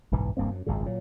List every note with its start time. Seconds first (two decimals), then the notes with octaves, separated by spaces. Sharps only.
0.11 F#1 B1 G#2 E3
0.37 D#1 G2 A#3 C4
0.51 F#2
0.66 G#1 C#2 F#2 C#3
0.86 A#2 F#3